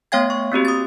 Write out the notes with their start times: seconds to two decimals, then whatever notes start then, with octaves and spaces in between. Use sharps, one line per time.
0.12 A3 B3 C#5 F5 G5 G#6
0.30 C#6
0.52 A#3 C4 F#4 G4
0.65 D#6 A6